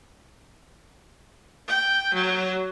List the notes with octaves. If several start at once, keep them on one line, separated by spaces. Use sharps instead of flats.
G5
F#3